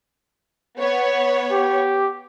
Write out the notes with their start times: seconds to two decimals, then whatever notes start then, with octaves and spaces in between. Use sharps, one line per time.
0.79 B3 C#5
1.52 G4